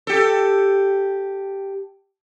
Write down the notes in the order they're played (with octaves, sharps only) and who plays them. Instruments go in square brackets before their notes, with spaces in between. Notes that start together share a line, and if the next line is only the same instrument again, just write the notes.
[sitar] G4 A4